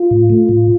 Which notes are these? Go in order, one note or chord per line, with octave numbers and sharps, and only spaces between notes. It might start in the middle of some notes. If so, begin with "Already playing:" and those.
Already playing: F4
A2
A3
A2